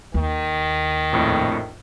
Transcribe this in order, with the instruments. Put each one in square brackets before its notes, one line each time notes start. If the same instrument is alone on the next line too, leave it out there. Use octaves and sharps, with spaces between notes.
[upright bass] D#2 [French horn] D#3
[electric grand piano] A#1 F2 A2